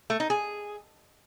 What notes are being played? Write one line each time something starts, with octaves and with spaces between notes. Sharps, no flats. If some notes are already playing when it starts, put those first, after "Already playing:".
A3
D#4
G#4